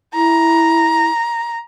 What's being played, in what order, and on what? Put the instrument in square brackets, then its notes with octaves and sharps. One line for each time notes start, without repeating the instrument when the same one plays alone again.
[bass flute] E4 [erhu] A#5